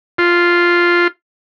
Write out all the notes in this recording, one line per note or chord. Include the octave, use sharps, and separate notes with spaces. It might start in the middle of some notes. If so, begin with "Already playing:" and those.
F4